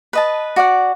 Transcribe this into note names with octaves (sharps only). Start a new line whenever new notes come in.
B4 D#5 A5
F#4 D5 F#5